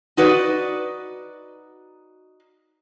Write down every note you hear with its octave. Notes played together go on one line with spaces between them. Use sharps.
D#4 F#4 B4 D5